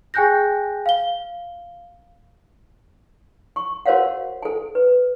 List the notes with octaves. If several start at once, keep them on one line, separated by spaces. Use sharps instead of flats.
G#4 G5 G#5 F#6 G6 A#6
F5 G7
C#6
F#4 A#4 C5 C#5 F5 F#5
A4 G#5
B4